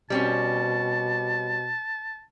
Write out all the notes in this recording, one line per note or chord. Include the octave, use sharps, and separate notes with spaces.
B2 G3 C4 C#4 A5